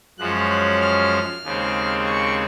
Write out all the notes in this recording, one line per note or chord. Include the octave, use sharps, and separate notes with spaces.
F#2 F3 G#3 C#4 F#6
F#6
F6
D#2 C#3 G#3 C4
C#6